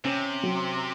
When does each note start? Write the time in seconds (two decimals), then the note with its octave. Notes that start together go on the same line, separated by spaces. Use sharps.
0.05 C3 C#4
0.43 F#3